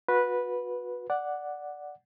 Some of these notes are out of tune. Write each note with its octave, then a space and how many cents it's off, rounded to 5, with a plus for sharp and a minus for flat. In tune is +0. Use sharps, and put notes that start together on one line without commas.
F#4 -30 B4 -10
D5 +0 F#5 +0